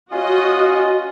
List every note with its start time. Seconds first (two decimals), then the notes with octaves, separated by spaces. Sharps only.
0.12 C#4 F4 F#4 D#5